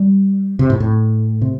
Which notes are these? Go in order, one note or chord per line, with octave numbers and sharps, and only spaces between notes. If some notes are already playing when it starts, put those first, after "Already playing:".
Already playing: G3
C3
A2
A2
C3